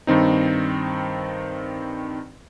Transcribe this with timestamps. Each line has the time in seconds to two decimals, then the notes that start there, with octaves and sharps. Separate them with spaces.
0.07 G2 D#3 C4 D#4